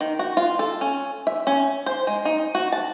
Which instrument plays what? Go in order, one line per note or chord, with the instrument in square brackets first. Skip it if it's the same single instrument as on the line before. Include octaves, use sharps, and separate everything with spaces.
[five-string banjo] D#3
F#4
F4
A4
C#4
E5
C#4
C5
G#3
D#4
F#4
A5